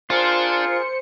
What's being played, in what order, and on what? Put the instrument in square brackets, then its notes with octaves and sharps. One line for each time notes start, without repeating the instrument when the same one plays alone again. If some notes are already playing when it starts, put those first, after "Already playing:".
[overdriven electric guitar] D4 [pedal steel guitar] F4 [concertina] G#4 A#4 [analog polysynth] C5 C#7